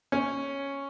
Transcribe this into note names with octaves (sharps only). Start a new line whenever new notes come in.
C#4